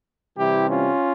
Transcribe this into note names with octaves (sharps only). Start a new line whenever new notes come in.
C3 E3 G3 C4 E4 G4
C#4 F4